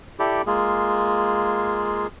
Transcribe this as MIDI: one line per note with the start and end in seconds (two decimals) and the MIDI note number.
0.19 0.42 64
0.19 0.42 67
0.19 0.42 69
0.19 0.42 74
0.47 2.07 56
0.47 2.07 58
0.47 2.07 65
0.47 2.07 68